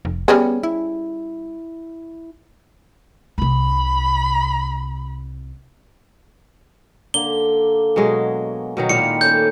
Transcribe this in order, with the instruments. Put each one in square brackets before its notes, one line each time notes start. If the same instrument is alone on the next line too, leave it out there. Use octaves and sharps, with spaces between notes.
[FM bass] F1
[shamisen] G3 C#4 G#4 [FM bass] B3
[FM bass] E4
[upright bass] C2 C3 [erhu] B5
[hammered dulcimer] D3 A#3 [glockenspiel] G7
[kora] B2 F#3 G#3 [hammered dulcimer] G#5 C#6
[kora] B2 D#3 F#3
[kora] A#2 A#3 F5 [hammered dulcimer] G#3 E4 G4 [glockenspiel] C#7
[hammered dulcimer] A3 C#4 A4 [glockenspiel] G6